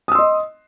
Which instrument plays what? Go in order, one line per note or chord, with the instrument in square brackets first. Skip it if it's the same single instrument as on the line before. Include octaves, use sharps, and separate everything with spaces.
[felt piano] D#6
E6
C6
D#5